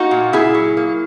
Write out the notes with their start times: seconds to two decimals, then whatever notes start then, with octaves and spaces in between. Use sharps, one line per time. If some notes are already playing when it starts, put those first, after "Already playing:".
Already playing: A#3 D#4 F#4
0.11 A#2
0.33 A#2 E4 G#4
0.54 F#3
0.77 A#3